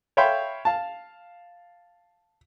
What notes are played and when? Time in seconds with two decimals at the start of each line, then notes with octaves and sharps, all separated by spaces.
0.17 C#5 E5 F5 G5 B5 C6
0.65 F5 A5